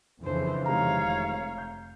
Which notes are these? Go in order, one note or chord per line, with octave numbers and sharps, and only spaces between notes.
F2 C#3 E3 D4 C5
C3 D#3 G#3 C#5 F5 A#5
F1
G6